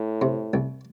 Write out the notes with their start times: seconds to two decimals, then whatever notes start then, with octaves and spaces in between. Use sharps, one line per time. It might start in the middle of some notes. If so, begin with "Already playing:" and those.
Already playing: A2
0.22 C3
0.54 C2